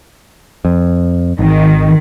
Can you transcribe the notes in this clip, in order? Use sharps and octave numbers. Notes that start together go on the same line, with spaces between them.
F2
G#1 D#3